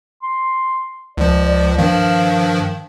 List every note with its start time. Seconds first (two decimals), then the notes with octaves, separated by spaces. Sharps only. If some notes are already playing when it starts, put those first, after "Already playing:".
0.23 C6
1.17 C#2 F3 D5
1.45 D5
1.78 G2 D#3 F3 F5